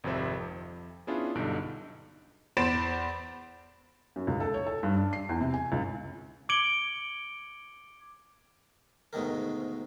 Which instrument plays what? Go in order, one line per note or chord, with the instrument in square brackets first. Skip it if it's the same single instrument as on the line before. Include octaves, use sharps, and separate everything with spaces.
[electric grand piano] G#1 F2 C3 C4 E5
F2
B3 C#4 D4 E4 F4 G#4
B1 G2 D3 D#4 D7
[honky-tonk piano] E2 C5 B5 A6 D7 E7
[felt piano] F#2
C#2
A4
C#5
A4
G2
D4
C7
E2
C3
G#5
C#2
[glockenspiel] D6 G#6 C#7 D7 F#7 G7
[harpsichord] D2 G#2 B2 D#3 A#4